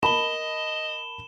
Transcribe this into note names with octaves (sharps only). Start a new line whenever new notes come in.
A#4 D#5 A5 B5 E7 G7